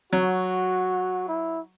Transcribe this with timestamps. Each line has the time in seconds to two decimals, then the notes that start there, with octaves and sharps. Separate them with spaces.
0.13 F#3 F#4
1.28 E4